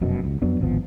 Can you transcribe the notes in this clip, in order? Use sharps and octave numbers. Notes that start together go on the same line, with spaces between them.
F1 F#2 B2
C#2
F2 F#3 B3 D4
D1 G#1 F3 B3